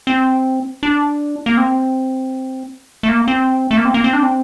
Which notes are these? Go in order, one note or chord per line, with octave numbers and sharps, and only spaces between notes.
C4
D4
A#3
C4
A3
A#3
C4
A3
A#3
C4
A#3
C4
D4
C4